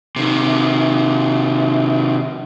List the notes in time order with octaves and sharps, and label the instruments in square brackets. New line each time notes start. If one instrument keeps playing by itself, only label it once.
[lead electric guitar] C3 D#3